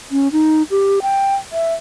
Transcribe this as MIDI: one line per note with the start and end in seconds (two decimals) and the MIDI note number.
0.11 0.28 61
0.32 0.63 63
0.71 0.99 67
1.02 1.35 79
1.52 1.74 76